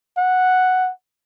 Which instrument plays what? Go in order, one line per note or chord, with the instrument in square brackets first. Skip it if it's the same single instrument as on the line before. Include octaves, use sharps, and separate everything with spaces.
[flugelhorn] F#5